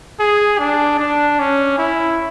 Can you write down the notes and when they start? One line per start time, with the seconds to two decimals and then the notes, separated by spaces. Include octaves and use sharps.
0.20 G#4
0.59 D4
0.99 D4
1.39 C#4
1.78 E4